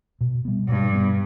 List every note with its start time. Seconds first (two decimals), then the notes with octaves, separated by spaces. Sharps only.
0.21 B2
0.45 G3 B3
0.68 G2 B2
0.92 G3 B3